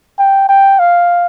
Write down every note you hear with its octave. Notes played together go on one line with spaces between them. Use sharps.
G5
G5
F5